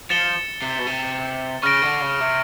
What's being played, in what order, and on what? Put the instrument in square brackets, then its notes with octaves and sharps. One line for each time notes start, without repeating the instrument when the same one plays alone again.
[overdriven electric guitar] F3 [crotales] A6 C#7 E7 G7
[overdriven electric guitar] C3
B2
C3
[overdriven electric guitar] C#3 [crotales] C#6 F6 A#6 D7
[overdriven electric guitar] D3
C#3
C3